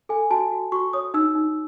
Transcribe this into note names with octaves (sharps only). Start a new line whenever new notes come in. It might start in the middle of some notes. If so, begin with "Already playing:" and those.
A4 G#5
F#4 A5
F#4
F#4 C#6
C#5 D#6
D#4 E6
D#4